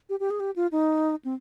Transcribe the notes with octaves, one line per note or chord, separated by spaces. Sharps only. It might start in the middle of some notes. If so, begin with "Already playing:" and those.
G4
G4
G#4
G4
F4
D#4
C4